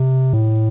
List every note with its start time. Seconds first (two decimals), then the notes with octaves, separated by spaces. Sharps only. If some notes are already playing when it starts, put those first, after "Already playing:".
Already playing: C3
0.33 A2